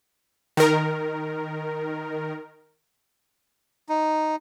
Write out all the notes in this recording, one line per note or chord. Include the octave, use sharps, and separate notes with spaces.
D#3 A#4
D#4